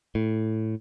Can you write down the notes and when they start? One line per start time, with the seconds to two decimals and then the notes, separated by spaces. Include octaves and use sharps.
0.15 A2